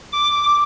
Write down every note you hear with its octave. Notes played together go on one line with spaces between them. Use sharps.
D6